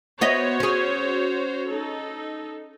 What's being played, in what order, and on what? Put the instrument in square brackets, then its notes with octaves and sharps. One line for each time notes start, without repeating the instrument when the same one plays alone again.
[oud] B3 D#5 E5 [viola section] F#4 C5 C#5
[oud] C#4 G#4
[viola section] D#4 A4